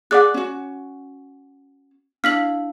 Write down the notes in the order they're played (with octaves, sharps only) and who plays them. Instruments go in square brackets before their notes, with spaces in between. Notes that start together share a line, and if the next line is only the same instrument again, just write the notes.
[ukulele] G#4 D5 [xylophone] F#5 D6 F#6
[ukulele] C#4 F#4
[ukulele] D4 E4 F5 [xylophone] F6 B6 F#7